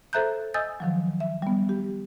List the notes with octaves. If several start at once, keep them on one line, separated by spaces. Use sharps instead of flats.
A4 C5 E5 A#5 F#6 G6
D#5 G#5 D#6 E6 G6 A6
D#3 F3 F#3
E5
G3 B3
G4